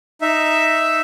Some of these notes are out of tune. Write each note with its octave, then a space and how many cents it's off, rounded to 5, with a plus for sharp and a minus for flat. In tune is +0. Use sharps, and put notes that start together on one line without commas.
D#4 +0 E5 +0